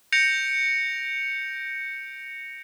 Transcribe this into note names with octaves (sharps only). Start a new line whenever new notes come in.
G6 A#6 C#7 D7 F7